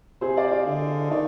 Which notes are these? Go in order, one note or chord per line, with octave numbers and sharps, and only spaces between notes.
C3 G#4 C5
D5 F5
D5 F5
D3
D#5
D#3 D5 F5